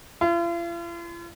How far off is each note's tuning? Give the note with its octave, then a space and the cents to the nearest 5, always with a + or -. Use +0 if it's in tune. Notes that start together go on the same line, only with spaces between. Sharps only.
F4 -45